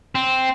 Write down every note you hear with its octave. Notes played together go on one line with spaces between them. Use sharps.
C4